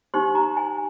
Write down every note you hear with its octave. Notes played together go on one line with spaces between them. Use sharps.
D#4 G4 C5 C6
A#5
G#5